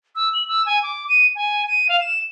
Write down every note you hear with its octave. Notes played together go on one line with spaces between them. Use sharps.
E6
F#7
E6
G#5
D6
D#7
G#5
D#7
F5
E7